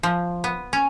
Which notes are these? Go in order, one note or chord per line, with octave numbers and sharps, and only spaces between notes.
F3
B3
C#4